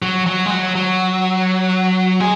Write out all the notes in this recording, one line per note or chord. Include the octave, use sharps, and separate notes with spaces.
F#3
F#3
G#3
F#3
F#3
G#3